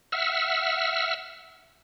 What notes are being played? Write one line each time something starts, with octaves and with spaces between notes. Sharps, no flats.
E5 F#5 E6 F6